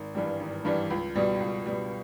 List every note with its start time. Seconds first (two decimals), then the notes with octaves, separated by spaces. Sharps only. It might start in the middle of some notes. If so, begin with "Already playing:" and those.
Already playing: G#1
0.15 G2 E3 G3
0.40 G#1
0.65 G2 E3 G3
0.90 C#2
1.15 B2 G3
1.40 C#2
1.66 B2 G3